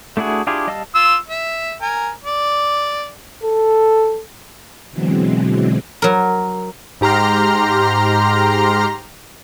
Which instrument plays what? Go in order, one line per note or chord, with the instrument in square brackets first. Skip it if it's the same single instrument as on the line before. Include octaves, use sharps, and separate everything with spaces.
[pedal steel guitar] A3 D4 E4 F#4 G#4
D4 E4 F4 G4 G#4
G3 D#5 F5 A5 E6
[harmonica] F4 E6
E5
A#4 G#5
D5
[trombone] A4
[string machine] B2 D3 E3 F#3 G#3 C4
[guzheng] F#3 A#4
[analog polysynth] G#2 G4 A#5 C6 F6